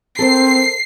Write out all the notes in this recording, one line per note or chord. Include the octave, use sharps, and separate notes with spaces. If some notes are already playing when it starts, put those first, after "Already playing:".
C4 A4 A#4 C5 C7